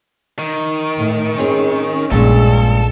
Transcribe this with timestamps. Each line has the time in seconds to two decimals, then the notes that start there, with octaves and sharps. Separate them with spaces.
0.39 D#3
0.97 A2
1.38 C4 C#4 G#4 C#5
2.12 A#1 G2 A#2 G#3 A4